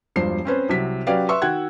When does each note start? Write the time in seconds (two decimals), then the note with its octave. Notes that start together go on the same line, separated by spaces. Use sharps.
0.16 E1 G2 F3 C5 C7
0.45 C4 C#4 B4 C5
0.69 C2 C3 F#3 B6
1.07 F#3 C#4 G4 B4 D5 F5
1.29 B4 E5 C6 C#6 E6
1.42 D#3 F#4 F#5 G5 F#6 G#6